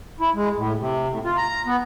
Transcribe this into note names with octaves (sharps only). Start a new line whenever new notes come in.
E4
G#3
A2
C3
A2
F4
A#5
B3